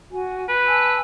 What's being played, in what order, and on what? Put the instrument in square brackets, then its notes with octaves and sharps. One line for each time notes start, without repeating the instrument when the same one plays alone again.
[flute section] F#4 G#5
[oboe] B4
[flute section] G#5 A5 E6